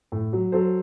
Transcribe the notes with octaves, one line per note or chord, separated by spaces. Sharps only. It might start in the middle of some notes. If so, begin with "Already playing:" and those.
A2
F#3
F#3 A4 C5